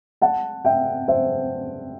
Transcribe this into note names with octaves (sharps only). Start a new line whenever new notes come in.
F#5 A5
E5 G5
C5 E5